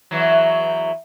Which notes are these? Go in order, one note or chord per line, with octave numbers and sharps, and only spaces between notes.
E2 E3 F#3